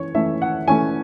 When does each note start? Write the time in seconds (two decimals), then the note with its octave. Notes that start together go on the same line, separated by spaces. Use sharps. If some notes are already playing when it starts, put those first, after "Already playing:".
Already playing: E3 C#4 C#5
0.15 E3 A3 C#4 E5
0.42 F#5
0.68 E3 A3 C#4 G#5